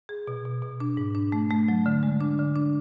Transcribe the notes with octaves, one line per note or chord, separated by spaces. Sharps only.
G#4
B2
B2
B2
D4
G#2
D4
A3
A3
F#3
D3
G#3
D4
D3
D4